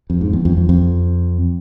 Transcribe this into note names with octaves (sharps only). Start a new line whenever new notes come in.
F2
G#2
E2
F2
F2
F2